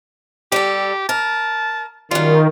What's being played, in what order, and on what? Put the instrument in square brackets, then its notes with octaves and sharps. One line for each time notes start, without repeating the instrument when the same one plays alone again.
[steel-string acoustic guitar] G3 A4 [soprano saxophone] G4
[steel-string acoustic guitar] A#4 [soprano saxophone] A5
[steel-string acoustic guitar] F#2 G3 [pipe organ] D#3 [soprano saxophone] F4